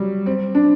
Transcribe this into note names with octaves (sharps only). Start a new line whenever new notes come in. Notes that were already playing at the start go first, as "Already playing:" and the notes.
Already playing: F#3 G3
C4
D4